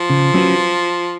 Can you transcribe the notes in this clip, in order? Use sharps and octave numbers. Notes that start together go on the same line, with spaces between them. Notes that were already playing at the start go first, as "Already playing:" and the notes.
Already playing: F3
C#3
F#3 C#4 F#4 B4